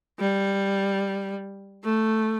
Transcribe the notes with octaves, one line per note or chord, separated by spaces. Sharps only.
G3
A3